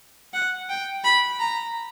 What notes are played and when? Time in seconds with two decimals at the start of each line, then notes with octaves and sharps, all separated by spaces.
0.33 F#5
0.69 G5
1.04 B5
1.40 A#5